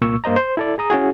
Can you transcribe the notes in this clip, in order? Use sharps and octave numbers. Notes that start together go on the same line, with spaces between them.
C2 A#2 A#3 C#6 E6
G2 A#3 C5 D#5 A#5
C5
E4 A4 D5
G#4 A#5 D#6
C#4 E4 F#4 G#4